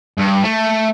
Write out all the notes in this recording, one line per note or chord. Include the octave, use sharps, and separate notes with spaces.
G2
A3